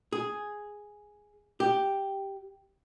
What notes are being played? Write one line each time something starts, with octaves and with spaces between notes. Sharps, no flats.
G#4
G4